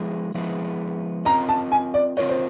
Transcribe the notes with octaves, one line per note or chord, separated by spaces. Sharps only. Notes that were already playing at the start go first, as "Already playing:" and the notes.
Already playing: F3 G#3 B3 E4 G#4
F3 G#3 B3 E4 G#4
C4 F4 A#4 D#5 A#5
A5
G#5
D5
C4 F4 A#4 C#5 D#5
C5